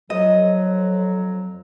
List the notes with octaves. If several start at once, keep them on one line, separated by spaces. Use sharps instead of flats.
F2 F#3 D#5